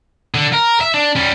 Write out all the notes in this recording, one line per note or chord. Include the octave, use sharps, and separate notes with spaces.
D3
A#4
E5
D4
G3 C#4